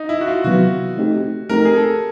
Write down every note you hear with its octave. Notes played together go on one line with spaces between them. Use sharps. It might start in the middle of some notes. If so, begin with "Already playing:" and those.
Already playing: D#4
E4
F#4
F4
C3 D#3 F#3 B3 F#4
A3 C4 D#4 G4
A3 C4 D#4 G4 A#4
G#4
A4